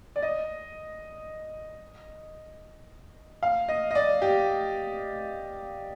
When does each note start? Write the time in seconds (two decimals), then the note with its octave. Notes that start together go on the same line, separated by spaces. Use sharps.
0.16 D5
0.22 D#5
3.43 F5
3.69 D#5
3.91 D#5
3.95 D5
4.22 G4